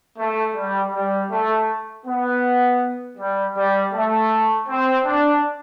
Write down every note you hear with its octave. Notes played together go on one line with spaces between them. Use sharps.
A3
G3
G3
A3
B3
G3
G3
A3
C4
D4